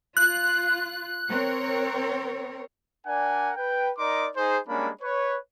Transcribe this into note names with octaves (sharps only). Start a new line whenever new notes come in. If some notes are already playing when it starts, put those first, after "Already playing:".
F4 F#6
C4 A#4 C#5
D4 A#4 D5 F#5 G#5
B4 G5
D#4 A#4 D5 D#5 C6 D6
D#4 G#4 C5
G3 G#3 A#3 C#4 D4 B5
B4 C#5